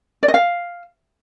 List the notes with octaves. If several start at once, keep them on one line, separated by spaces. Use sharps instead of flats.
D5
D#5
F5